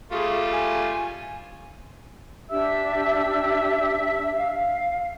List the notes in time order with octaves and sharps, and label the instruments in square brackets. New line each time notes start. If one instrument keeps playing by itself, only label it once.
[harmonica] G3 A3 F4 [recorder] G#4
[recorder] G#5
[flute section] D4 G4 E5 E6
F5